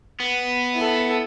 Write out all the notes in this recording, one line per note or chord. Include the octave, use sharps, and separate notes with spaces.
B3
E4 A4